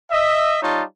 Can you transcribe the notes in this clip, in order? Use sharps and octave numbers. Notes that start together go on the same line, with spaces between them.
D#5 E5
G3 D#4 F4 C#5 A5